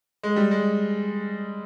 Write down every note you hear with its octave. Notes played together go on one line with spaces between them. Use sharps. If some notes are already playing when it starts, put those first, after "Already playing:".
G#3
G3
G#3